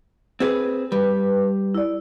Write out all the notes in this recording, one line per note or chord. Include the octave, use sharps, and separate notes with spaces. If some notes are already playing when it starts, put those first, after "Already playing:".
C4 G#4 B4
G3 B4
E4 D5